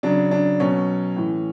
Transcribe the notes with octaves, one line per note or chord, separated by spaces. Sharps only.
C#3 F#3 D4
D4
B2 F#3 C#4
A2 E3